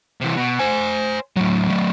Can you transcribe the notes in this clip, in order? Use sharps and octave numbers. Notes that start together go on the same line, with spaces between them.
C3 E3
B2
C5 G#5
A2 F#3
F#3 A3